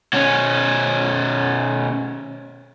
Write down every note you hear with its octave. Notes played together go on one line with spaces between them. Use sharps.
B2 C#4